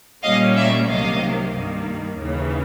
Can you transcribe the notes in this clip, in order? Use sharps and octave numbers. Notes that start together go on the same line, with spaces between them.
A#2 G3 A#3 C#4 D#5 F5
D5 E5
C2 C3 D#3 F#3 A#3 D#5 F5
G2 D#3 G3 A#3
D#2 C#3 E3